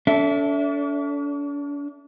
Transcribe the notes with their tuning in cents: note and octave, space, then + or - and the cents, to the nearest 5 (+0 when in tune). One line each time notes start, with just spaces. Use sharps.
D4 -45 A4 +0 E5 +0